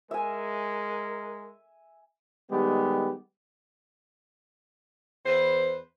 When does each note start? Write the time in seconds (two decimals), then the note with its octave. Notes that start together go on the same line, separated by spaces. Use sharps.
0.11 G#3 A#4 E5 G#5
2.50 D#3 G3 G#3 B3 G4
5.26 E2 B4 C5